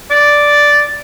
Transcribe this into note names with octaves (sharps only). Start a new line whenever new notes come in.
D5